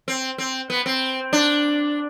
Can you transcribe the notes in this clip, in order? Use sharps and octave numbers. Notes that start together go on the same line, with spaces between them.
C4
C4
B3
C4
D4